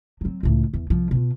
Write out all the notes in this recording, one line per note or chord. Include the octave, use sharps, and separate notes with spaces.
F#3 C4
C#2 A2
E2
C2 F3
B2 F4